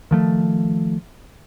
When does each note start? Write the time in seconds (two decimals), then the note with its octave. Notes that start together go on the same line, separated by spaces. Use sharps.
0.11 D#3 F3 A3